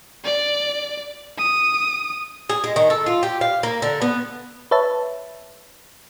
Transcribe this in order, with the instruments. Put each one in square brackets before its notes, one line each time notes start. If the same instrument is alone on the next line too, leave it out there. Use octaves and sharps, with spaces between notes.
[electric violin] D5
D#6
[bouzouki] G#4
G#3
D#3
A4
F4
G4
F5
A#3
D3
B3
[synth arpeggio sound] B4 C#5 E5 A5